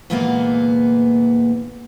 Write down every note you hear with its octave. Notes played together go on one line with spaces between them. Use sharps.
D2 A#2 E3 G#3 A#3 B3